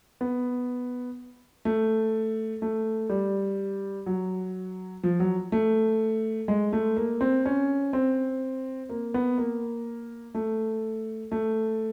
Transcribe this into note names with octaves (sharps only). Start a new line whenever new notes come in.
B3
A3
A3
G3
F#3
F3
F#3
A3
G#3
A3
A#3
C4
C#4
C4
A#3
B3
A#3
A3
A3